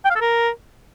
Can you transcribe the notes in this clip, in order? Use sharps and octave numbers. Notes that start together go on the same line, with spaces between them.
G5
F5
A4
A#4